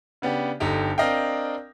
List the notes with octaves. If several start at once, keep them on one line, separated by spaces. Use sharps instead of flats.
C#3 B3 D4 G4
G1 D3 D#4 G4 G5
C4 D4 A#4 D#5 F5 G5